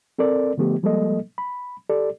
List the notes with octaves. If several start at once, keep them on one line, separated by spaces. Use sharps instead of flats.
C4 A4 A#4 D5
D3 F3 A3 B3 G4
F3 G3 G#3 A#3 A4 D#5
B5
G4 A4 D5